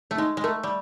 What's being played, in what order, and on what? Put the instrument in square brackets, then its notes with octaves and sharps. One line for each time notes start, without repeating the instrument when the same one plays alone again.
[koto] A3
[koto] G#3 [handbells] D#4
[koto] G#3
[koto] A3 [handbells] A#4
[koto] G3